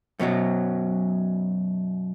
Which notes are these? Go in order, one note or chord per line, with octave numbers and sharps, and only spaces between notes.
F#2 B2 E3 F#3